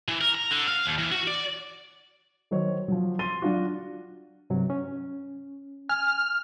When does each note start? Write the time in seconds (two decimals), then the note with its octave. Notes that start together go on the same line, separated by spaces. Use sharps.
0.08 E3
0.21 A#4
0.35 A#5
0.51 D3
0.67 F5
0.86 D#2
0.99 E3
1.12 F#4
1.27 D5
2.51 D#3 F#3 C5 C#5
2.88 F3 F#3
3.19 C6 A6 D#7 G7
3.42 F#3 D4 F4 F#4
4.50 G2 C3 F#3
4.70 C#4
5.89 G#5 F6